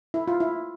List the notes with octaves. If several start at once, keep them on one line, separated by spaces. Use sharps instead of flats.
E4
F4
E4